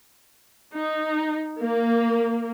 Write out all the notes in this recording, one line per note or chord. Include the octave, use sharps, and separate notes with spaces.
D#4
A#3